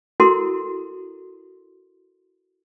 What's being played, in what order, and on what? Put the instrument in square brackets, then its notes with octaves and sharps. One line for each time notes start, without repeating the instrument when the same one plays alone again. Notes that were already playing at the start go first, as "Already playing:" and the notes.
[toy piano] E4 F#4 A4 A#4 C6